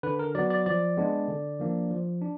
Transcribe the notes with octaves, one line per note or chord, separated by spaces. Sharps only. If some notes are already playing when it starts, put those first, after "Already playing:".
D3 B4
A#4
F#3 B3 D5
D5
F3 D5
G#3 B3 D4
D3
F3 A#3 D4
F3
D4